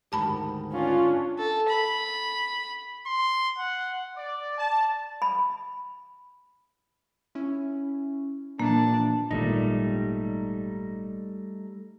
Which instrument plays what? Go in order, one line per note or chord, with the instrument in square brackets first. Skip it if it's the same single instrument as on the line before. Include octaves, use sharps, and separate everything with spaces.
[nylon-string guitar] D2 G#2 D#3 [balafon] G4 A5 B5
[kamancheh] C#4 D4 [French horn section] F4
[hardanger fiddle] A4
B5
[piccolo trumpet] C6
F#5
[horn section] D5
A5
[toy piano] B5
[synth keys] C#4 E4
[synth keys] A#2 E3 F3 [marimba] A#3 [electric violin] D4 A5
[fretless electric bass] G#1 A#2 [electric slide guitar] G3 A3 D#4